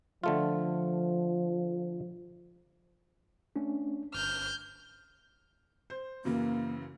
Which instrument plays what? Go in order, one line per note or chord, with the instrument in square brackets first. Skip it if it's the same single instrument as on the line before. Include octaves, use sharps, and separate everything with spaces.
[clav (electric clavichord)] D3 A3 F4 [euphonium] F3
[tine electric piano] A3 C#4 D4
[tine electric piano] G1 [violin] F6 G6
[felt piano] C5
[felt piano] F#2 C#3 E3 [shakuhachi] A#3